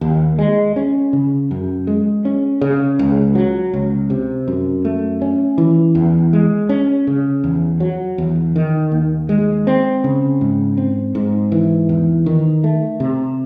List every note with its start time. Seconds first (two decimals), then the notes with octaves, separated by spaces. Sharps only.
0.01 D#2
0.39 G#3
0.76 C#4
1.13 C#3
1.51 F#2
1.87 G#3
2.25 C#4
2.61 C#3
2.99 C#2
3.35 F#3
3.73 C#2
4.10 C3
4.48 F#2
4.85 A3
5.22 C#4
5.58 E3
5.95 E2
6.33 G#3
6.69 C#4
7.07 C#3
7.44 E2
7.80 F#3
8.18 E2
8.56 D#3
8.92 D#2
9.29 G#3
9.67 C4
10.04 C#3
10.41 G#2
10.77 C4
11.15 G#2
11.52 E3
11.89 E2
12.26 D#3
12.64 A3
13.00 C3